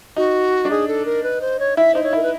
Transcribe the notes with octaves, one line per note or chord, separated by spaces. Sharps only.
D#4 F#4
D4
D#4 G#4
A4
A#4
B4
C5
C#5
E4 E5
D#4 C5
C#5
E4 A#4
B4